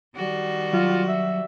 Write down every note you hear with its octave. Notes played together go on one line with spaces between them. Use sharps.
D#3 G3 F#4
F#3 F4
E5